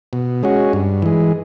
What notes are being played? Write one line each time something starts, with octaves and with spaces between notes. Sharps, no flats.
B2
G#3 C#4 F#4
G2
E3 G#3